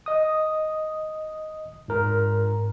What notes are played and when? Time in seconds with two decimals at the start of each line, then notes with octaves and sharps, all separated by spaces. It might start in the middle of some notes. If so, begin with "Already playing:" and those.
0.06 D#5 D#6
1.88 G#2 A#4